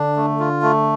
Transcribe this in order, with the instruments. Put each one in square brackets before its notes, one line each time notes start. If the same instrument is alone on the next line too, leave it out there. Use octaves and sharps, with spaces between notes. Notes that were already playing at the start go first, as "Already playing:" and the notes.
Already playing: [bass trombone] D3 [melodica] D4
[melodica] A3
F4
A3